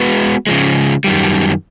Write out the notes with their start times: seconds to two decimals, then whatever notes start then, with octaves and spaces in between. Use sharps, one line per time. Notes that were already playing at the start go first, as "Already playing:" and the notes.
Already playing: G#3 B3 F#4 B4
0.47 C#3 F3 G#3
1.04 F#2 D#3 G3